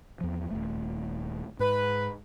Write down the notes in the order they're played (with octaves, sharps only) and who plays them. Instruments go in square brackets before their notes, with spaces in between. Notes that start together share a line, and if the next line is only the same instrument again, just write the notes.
[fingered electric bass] E2 F3
D#1 C#2 A3
[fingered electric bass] G#2 [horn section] B4